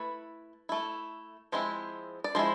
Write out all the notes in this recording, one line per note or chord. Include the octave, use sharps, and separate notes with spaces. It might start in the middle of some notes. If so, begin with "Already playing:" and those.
Already playing: A3 E4 B4
A3 E4
F3 G#3 C4 E4
D5
F3 G#3 E4 C5